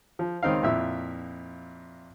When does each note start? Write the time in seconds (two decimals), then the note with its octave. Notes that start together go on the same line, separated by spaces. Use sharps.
0.19 F3
0.43 C#2 D#3 C4 D#4 F5
0.63 F2 A#2 E4 E5